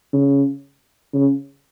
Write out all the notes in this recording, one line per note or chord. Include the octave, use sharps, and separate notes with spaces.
C#3
C#3